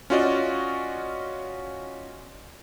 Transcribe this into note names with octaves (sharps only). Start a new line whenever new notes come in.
C#4 F4 F#4 D5 D#5